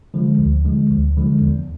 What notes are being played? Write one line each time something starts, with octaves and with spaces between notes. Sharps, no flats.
D3 F3 G#3
D2
D3 F3 G#3
D2
D3 F3 G#3
E2